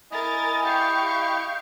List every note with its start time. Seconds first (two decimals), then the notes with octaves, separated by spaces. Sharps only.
0.11 E4 A#4 D#5 G#5 A6
0.66 G4 F5 C#6 G6